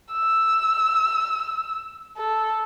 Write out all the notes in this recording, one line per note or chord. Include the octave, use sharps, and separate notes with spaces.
E6
A4